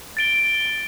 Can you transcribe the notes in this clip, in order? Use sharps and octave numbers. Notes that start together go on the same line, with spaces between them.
A6 D7 G7